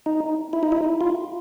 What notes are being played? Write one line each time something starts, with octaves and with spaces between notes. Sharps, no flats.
D#4
E4
D#4
E4
F4